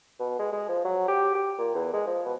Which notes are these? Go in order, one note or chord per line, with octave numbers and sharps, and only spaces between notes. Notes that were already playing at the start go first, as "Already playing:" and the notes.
B2
G#3
G#3
F3
F#3
G4
G4
A#2
E2
G#3
F3
B2